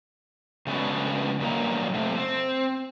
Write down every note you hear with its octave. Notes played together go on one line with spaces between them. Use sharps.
C#3 G#3 A3 B3 D4 F#4
G2 A#2 D#3 F#3 A#3 A#5
C3 A3
C4